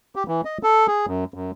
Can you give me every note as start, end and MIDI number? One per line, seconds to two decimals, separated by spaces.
0.15 0.23 67
0.28 0.41 52
0.45 0.58 75
0.63 0.87 69
0.88 1.06 68
1.07 1.24 42
1.34 1.51 42